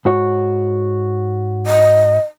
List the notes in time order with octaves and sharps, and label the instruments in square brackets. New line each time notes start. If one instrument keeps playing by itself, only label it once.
[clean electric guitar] G#2 F#4 C#5
[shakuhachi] D#5